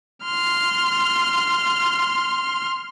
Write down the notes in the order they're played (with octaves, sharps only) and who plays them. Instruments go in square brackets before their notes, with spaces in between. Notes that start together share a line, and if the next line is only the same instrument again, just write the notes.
[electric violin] C6 F6